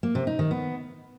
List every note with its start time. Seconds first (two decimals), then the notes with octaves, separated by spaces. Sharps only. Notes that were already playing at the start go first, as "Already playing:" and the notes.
0.03 A#3
0.15 C3
0.27 D#4
0.39 D#3
0.51 B3